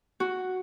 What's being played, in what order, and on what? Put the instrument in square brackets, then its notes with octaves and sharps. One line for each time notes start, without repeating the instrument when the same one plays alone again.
[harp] F#4